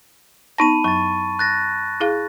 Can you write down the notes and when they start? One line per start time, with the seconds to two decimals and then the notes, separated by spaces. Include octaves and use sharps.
0.58 B3 D#4 A5 B5 A#6 D#7
0.84 F#2 F#3 C#6 A6
1.39 F#6 A6 A#6
2.00 E4 G#4 F5